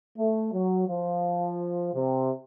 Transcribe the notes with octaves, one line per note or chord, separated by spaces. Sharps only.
A3
F#3
F3
C3